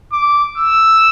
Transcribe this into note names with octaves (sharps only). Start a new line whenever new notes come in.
D6
E6